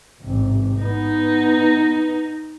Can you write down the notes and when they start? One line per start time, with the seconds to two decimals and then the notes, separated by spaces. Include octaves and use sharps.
0.20 A1 G#2 C3
0.82 B3 D#4